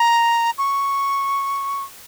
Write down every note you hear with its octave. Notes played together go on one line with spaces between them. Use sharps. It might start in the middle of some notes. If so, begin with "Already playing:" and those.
Already playing: A#5
C#6